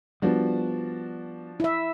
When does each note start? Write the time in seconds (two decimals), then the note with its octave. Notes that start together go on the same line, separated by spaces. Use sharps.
0.22 F3 G3 A#3 B3 D4 F#4
1.60 E4 E5